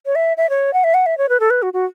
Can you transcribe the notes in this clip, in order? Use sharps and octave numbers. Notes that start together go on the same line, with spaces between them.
C#5
E5
E5
C#5
F#5
E5
F#5
E5
C#5
B4
A4
B4
F#4
F#4